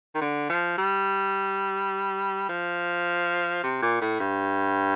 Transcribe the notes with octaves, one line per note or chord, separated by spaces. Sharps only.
D#3
D3
F3
G3
F3
C3
A#2
A2
G2